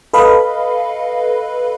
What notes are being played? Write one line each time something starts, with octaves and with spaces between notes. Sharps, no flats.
A4 B4 D#5 F5 B5